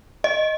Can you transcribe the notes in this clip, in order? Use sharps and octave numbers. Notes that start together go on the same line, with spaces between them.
D#5